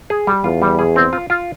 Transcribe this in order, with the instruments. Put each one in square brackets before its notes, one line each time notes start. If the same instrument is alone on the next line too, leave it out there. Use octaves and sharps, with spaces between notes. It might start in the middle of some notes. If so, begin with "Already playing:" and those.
[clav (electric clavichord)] G#4
G3
[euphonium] E2 [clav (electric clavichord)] F4
[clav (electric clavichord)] G3
G#4
C4
F4
F4